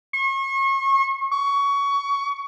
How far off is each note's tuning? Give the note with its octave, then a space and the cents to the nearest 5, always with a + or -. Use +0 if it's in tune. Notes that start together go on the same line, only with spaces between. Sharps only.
C#6 -40
C#6 +20